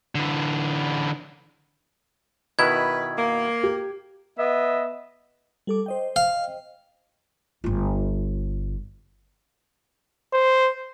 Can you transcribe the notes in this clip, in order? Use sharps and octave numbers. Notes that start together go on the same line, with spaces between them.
D3 E3
B2 D#3 E4 B4 G#6
A#3
G4
B3 D#5 E5
G3 A4 D6
C5 D#5 G5
F5
G1 F4
C5